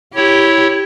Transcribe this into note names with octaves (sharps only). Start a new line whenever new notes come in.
E4 G4 C#5